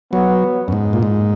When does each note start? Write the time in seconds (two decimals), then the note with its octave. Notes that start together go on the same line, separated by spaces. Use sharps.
0.12 F#3 B3
0.68 F#2
0.72 G#2
0.93 A#2
1.03 G#2